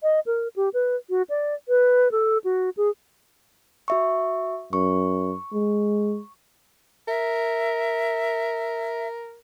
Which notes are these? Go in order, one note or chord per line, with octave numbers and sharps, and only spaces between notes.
D#5
A#4
G4
B4
F#4
D5
B4
A4
F#4
G#4
F#4 E5 C#6
F#2 C#6
G#3
A#4 E5